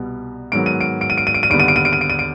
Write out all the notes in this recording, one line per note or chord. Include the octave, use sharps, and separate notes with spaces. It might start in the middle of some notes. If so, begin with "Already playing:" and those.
Already playing: C2 B2 G3 B3
G#2 D#3 F#3 B3 D7
D#7
D7
D7
D#7
D7
D#7
D7
D#7
D#2 D3 G3 B3 D7
D#7
D7
D#7
D7
D#7
D7
D#7
D7